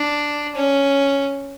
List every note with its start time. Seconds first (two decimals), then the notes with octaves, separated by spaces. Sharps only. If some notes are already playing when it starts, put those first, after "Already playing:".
Already playing: D4
0.55 C#4